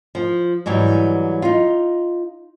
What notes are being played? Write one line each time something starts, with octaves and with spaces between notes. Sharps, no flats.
F3
G#2 E3 F#3 G3
D#4 F4